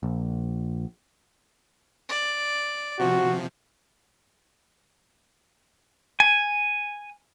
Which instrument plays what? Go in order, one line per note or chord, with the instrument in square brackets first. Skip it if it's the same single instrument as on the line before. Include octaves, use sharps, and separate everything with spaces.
[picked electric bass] A#1
[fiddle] D5
[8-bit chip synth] C3 F3 [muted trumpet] F#4
[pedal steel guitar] G#5